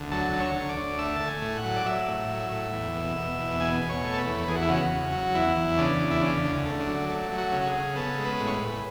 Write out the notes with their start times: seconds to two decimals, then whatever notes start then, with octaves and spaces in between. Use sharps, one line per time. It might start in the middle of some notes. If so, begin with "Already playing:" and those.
Already playing: D2
0.11 F#3 A4
0.33 D2
0.40 C#5
0.56 D2
0.69 D5
0.77 D2
0.99 A3 E5
1.16 A3 A5
1.28 G#5
1.42 A2
1.57 F#5
1.64 F#3
1.76 D5
1.86 F#3 E5
2.08 A2
2.29 F#3
2.51 A2
2.73 E2
2.94 B2
3.16 B2
3.39 E2
3.60 B2 G#5
3.81 B2
3.89 C#5
4.04 A3
4.14 A4
4.18 B4
4.26 E2
4.48 E2 G#4
4.56 F#4
4.62 E4
4.69 C#3 F#4
4.90 C#3
5.12 F#3
5.35 E2 E4
5.57 E2
5.78 C#3 D4
6.00 E2
6.11 E4
6.21 C#3 D4
6.44 D2
6.66 A3
6.80 D4
6.87 F#3
7.09 A3
7.31 F#3
7.38 F#4
7.52 C#3
7.61 F#4
7.67 G#4
7.75 C#3
7.96 B3 A4
8.19 G#3
8.25 B4
8.40 A2
8.47 C#5
8.54 B4
8.62 A2